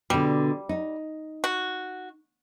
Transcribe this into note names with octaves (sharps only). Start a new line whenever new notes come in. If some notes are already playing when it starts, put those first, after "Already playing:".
B2 D3 G3
D#4
F#4